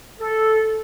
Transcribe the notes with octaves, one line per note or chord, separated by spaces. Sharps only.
A4